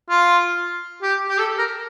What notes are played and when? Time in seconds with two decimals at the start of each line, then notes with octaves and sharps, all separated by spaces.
0.09 F4
1.02 G4
1.29 G4
1.39 A4
1.58 A#4